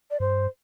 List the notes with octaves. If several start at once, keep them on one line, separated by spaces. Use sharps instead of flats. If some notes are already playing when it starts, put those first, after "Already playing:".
D5
G2 C5